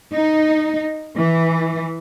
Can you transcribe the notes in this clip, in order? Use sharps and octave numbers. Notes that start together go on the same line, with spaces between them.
D#4
E3